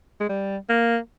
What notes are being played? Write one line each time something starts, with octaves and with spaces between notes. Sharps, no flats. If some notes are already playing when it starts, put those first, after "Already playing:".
G#3
G3
A#3